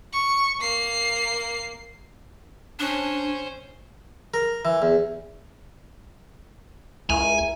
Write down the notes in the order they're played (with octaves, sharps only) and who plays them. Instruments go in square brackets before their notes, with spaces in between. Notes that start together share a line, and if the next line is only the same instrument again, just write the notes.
[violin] C#6
A#3 C7
[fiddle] C#4 C5 [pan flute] D4
[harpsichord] A#4
E3
E2
[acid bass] C#2 [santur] E4 A#4 F5 [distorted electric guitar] G#5